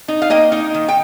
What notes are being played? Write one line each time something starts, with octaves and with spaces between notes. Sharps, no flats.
D#4
F5
A#3 D#5 G5
D#4
D#3
G5